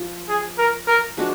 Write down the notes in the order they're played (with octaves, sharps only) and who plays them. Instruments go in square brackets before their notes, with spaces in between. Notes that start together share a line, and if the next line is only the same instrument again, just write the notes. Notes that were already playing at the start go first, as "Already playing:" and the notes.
Already playing: [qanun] F3 F4
[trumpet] G#4
A#4
A#4
[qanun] F3 G#3 D4 F#4